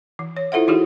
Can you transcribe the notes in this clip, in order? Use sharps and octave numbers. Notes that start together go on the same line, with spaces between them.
E3
C#5
E4 F4 A4 C5 E5 F#5
E3 D#4 F4 F#4 G#4